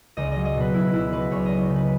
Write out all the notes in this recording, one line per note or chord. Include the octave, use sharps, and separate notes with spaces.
C#2 D#5
F#3 D#5
D#5
B2 B4
F#3 E4
C#2 E4
F#3 B4
C#2 C#5
D#5
F#3
C#3
B4